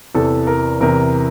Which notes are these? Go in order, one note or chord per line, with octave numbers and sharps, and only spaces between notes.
E2 C3 E3 A4
A#4
E2 C3 E3 A#4